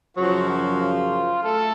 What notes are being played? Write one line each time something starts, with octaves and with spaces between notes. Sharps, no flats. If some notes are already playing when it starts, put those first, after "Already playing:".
F#2 C#3 F3 F#3 F#4
F#3 F#4
F4
A3 A4